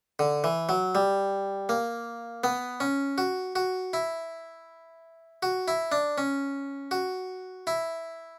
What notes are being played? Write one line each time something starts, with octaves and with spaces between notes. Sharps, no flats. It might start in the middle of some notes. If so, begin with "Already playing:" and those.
D3
E3
F#3
G3
A#3
B3
C#4
F#4
F#4
E4
F#4
E4
D4
C#4
F#4
E4